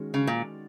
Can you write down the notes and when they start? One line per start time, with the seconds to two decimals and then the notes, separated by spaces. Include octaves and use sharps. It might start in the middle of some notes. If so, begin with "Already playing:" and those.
Already playing: D#3 G#3 C#4 F#4
0.14 C#3
0.27 A#2